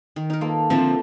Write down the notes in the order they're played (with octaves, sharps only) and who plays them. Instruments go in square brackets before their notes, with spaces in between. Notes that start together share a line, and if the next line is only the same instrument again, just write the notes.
[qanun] D#3
D#4 A#4
[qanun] A#3 [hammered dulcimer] F4 A4 B4
[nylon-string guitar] D3 F3 C4 [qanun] A#3 E5